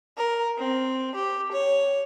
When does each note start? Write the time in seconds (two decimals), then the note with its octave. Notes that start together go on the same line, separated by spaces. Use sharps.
0.16 A#4
0.58 C4
1.15 G4
1.52 C#5